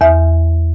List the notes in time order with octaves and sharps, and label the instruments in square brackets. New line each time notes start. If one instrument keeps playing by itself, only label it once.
[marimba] E2 E5